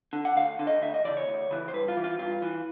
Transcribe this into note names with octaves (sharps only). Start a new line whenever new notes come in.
D3
F#5
D2 F5
D3
D#5
D2 E5
D#5
C#3 E3 D5
C#5
D2
C#3 E3
C5
G2 B4
F4
E3
F4
G2 F4
E3